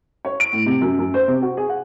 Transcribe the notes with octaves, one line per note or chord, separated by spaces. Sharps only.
C#5
D7
A2
C3
F#2
F#2
C5
C3
F#4
G#4
F#5